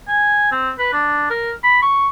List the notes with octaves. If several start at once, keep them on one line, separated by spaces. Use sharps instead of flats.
G#5
C4
B4
D4
A#4
B5
C#6